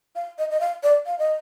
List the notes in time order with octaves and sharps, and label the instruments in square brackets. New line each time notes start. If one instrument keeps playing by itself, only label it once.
[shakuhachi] F5
D#5
D#5
F5
D5
F5
D#5